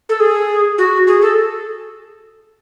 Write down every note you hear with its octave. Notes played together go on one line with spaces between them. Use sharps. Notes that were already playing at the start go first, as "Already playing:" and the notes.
A4
G#4
F#4
G#4
A4